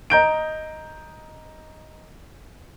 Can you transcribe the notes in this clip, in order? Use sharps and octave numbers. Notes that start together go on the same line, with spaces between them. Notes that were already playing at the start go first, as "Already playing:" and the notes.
D#5 A#5 G6 D7